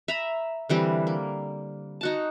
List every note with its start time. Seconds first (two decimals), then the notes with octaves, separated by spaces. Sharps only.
0.08 E5 A#5 B5
0.69 D3 E3 G3 C4
1.07 A#3
2.01 D#4 F#4 A5